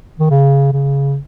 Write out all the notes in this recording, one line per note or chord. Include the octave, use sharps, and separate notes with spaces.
D#3
C#3
C#3